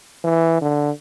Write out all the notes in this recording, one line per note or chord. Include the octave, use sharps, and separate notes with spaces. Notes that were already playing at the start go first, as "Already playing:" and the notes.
E3
D3